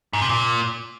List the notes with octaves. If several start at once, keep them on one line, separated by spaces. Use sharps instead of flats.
G#2
C3
A#2